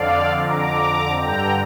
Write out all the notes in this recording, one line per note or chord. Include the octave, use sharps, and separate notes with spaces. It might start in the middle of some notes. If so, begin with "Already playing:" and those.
Already playing: F2 D3 D5 F5
A#5 D6
G2 D3 G5 A#5